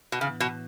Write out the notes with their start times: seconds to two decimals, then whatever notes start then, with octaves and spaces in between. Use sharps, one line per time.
0.12 B2
0.21 A2 C#3 E3 B3
0.40 B2